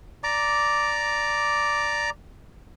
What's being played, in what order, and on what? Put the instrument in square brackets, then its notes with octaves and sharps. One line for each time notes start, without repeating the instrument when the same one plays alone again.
[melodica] D5 A#5 D6